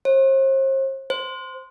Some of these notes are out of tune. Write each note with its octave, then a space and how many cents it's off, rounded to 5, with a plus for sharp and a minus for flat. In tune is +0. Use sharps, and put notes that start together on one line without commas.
C5 +40
C5 -10